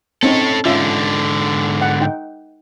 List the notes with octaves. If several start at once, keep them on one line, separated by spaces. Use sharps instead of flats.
C4 C#4 D#4 A4 C#5
G#2 D3 C#4 F4 E5
F#5
D#4 G5